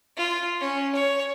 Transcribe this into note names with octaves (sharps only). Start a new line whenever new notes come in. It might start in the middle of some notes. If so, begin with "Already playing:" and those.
F4
C#4
C#5